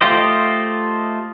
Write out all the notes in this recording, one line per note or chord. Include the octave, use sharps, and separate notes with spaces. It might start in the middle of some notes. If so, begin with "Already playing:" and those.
A3 F4 G4 C5 D#5